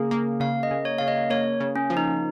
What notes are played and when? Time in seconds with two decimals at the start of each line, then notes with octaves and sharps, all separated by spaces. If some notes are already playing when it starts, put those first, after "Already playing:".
Already playing: C#3 A#3 G#4
0.11 A#3
0.40 C#3 F5
0.63 D#5
0.71 C#3
0.85 C#5
0.99 C#3 F5
1.08 D#5
1.30 A#3 C#5
1.60 C#3
1.76 C#4
1.90 F3
1.97 D#4